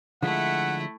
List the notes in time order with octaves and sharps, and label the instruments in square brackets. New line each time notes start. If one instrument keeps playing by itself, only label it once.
[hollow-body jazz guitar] D3 F3 G#3 [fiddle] A3 E4 [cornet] F#5